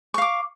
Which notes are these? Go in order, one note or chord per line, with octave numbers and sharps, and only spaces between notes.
F5 C#6 D6